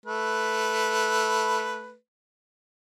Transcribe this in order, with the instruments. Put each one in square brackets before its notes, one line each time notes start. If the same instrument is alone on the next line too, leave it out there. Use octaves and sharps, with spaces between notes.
[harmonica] A3 B4